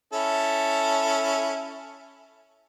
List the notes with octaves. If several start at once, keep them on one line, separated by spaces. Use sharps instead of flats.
C#4 E4 A4